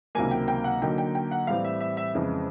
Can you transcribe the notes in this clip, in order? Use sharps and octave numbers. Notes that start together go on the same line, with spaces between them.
C#2 C3 D#3 F#3 A#3 G#5
G5
G5
F#5
D3 F#3 A#3 D#4 G5
G5
G5
F#5
A2 E3 G3 C4 F5
E5
E5
E5
F2 C#3 E3 G#3